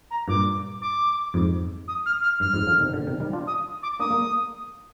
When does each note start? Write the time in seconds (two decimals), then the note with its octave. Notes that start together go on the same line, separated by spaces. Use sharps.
0.10 A#5
0.28 G2 A#2 D6
0.82 D6
1.34 F2 G#2
1.88 D#6
2.06 F6
2.22 F6
2.40 G2 F6
2.54 F2 G#2
2.67 D3 F3
2.80 C3 D#3
2.93 A#2 D3
3.07 C3 D#3
3.20 D#3 G3
3.33 D4 F4
3.47 D#6
3.83 D6
4.00 A#3 D4 D#6
4.11 A#3